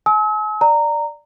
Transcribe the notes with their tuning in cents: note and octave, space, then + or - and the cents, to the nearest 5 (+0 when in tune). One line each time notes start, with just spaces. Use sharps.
G#5 +45 E6 -45
D5 +0 A#5 -15